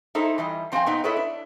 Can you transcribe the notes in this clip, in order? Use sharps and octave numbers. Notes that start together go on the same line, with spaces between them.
D#4 E4 A4 C5
E3 G3 D#5
F3 C4 C5 C#5 F5 G#5
A#2 B3 C4 D#4
E4 A4 B4 C#5 D#5
D4